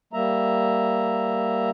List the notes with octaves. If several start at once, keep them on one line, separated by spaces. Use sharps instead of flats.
G3 A#3 E5 A#5